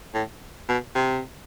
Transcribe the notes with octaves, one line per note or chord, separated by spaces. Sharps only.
A2
B2
C3